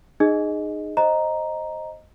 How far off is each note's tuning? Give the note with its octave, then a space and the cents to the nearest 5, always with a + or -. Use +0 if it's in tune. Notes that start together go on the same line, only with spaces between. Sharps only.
D#4 -25 G#4 +0 D#5 +0
C5 +20 D#5 +0 A#5 +0